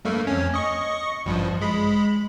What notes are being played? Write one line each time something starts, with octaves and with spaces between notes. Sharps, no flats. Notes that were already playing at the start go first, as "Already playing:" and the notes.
G2 A3 A#3
F2 C#4
D#5 C#6
A1 G2 F3
G#3 B5